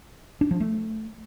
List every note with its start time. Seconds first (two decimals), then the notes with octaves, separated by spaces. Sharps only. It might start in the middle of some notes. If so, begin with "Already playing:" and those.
0.41 D4
0.51 F3
0.60 A3